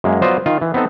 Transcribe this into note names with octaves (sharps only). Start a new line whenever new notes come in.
F#2 G#3 A#3
F#3 B3 F4 C5 D5 D#5
D#3 F4
E3
B3 C4 D#4 A4